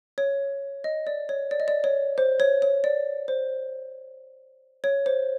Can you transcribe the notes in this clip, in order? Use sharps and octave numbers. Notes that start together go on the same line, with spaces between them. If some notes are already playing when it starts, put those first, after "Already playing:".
C#5
D#5
D5
C#5
D5
D#5
D5
C#5
C5
C#5
C#5
D5
C5
C#5
C5